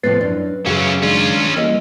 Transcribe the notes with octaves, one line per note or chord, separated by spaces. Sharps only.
A2 C3 F3 B3 B4 A5 C6
F#2 D4
F#2 C#3 E3 C#4 F#4 G#4 F5
D#3 G#3 C#4 D4 F4
E3 G3 A#3 A#4 D#5 F5 E6